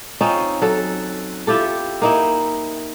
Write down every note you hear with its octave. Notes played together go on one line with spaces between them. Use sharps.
C4 C#4 D#4 F4
F#3 A4
E4 F4 G4 A4
A#3 D#4 E4